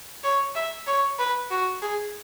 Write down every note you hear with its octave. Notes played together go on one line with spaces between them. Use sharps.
C#5
E5
C#5
B4
F#4
G#4